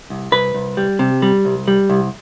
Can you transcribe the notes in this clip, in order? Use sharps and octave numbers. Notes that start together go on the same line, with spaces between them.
C2
C2 B4
C2
G3
C3
G3
C2
G3
C2